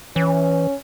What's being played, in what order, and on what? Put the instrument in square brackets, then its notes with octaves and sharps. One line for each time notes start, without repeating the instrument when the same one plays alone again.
[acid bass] E3 [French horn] C#4